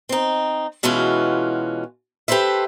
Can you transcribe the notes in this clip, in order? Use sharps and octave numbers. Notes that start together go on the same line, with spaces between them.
C4 D#4
B2 E3 G#3 C#4 F4 F#4
G4 A4 B4 C5 E5